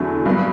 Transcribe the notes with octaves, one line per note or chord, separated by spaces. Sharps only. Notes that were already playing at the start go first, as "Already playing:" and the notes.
Already playing: E2 D3 F#3 A3
G2 F#3 B3